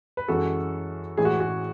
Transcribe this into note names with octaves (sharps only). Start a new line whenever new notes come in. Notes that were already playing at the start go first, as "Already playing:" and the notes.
B4
F#2 E3 G#3 F#4 A4
A1 A2 E3 G#3 G#4
F#4
F#4